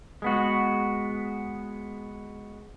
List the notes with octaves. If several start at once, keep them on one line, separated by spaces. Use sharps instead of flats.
G#3 B3 F#4